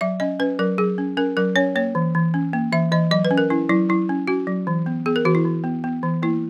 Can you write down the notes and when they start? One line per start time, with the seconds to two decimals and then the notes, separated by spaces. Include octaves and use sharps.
0.01 F#3 E5
0.20 C#4 D#5
0.40 C#4 B4
0.59 F#3 A#4
0.78 F#3 G#4
0.98 C#4
1.17 C#4 A#4
1.37 F#3 A#4
1.56 C#4 C#5
1.76 A#3 C#5
1.95 E3
2.15 E3
2.34 C#4
2.53 A#3
2.72 E3 E5
2.92 E3 D#5
3.11 F#3 D#5
3.25 B4
3.31 C#4
3.38 A#4
3.50 C#4 E4
3.69 F#3 E4
3.89 F#3 E4
4.09 C#4
4.28 C#4 F#4
4.47 F#3
4.67 E3
4.86 B3
5.06 B3 G#4
5.16 A#4
5.25 E3 F#4
5.35 E4
5.45 E3
5.64 B3
5.84 B3
6.03 E3
6.23 A#3 E4